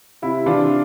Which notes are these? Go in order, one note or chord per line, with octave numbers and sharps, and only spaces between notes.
C3 E4
E3 D4 F4